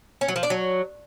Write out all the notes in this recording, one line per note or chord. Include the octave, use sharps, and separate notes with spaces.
C#4
F#3
F3
D4
F#3